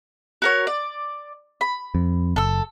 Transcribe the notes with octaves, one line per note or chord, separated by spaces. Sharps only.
F#4 A#4 C#5
D5
B5
F2
F#1 A4 E6